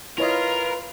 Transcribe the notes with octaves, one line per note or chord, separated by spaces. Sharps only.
E4 F4 A#4 B4 C#5 D#5